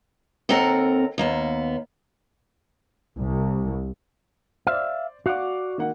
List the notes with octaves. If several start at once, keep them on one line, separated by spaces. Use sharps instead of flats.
D#2 C4 A4 A#4 F#5 A#5
D#2 A#3 B3
C2
C5 D5 E5 F5
F#4 D5 F5 F#5 D6
D#3 A#3 F#5